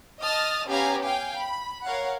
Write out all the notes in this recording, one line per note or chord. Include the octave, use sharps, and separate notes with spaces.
D#5 A5 D#6 F6 A6
B3 C#4 G4 F5 G#5 A#5
F5 G5 G#5
B5
A#4 C#5 F5 F#5